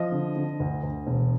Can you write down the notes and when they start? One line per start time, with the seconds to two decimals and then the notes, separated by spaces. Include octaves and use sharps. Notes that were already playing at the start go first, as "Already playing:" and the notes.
Already playing: F3 D#5
0.12 D3
0.36 D3
0.60 D2
0.83 D2
1.07 E1